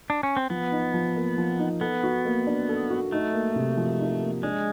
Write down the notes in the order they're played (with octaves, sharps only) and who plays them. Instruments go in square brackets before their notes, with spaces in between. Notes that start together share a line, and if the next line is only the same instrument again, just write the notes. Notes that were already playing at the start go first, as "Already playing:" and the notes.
[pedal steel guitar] D4
C#4
C4
[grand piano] F3 [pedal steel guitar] B3
[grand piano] D#4
F3
A#3
F3
D#4
[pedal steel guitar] B3 [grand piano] A4
[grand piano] F#4
A#3
D4
A4
F#4
[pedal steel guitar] A3 [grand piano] D#4
[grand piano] A#3
C3
F3
D#4
A#3
[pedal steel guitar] G#3 [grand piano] D4